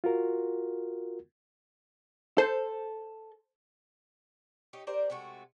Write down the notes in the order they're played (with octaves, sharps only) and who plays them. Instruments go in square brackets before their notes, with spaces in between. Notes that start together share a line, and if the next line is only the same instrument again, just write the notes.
[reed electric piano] F4 F#4 A#4
[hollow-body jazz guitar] A4 [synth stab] C5
[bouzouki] D#4 G4 C#5 D#5
G4 A#4 C5 D5
C3 G#3 A3 F#4